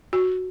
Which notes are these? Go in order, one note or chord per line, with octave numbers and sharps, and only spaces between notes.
F#4